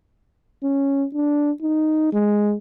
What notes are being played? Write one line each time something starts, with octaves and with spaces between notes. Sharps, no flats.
C#4
D4
D#4
G#3